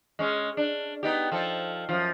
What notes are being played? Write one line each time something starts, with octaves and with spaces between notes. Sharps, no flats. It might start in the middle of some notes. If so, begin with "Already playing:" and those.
G#3 C#4
D4
B3 D#4 G4
F3 A4
F#2 A2 F3